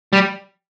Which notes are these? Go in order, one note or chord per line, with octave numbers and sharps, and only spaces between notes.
G3